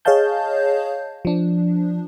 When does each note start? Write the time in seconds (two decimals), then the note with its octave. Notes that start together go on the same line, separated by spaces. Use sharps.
0.05 G#4 C#5 D#5 F5 A5 G6
1.25 F3 D4